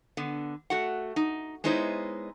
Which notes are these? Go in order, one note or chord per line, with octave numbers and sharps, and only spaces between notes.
D3 B3
A3 F#4 F#5
D#4
G#3 B3 D#4 E4 C5 C#5